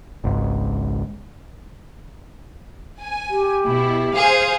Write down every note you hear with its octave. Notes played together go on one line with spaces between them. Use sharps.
G#1 C#2 G#2
G#5
G4
B2 E4
G#4 C5 F5 G#5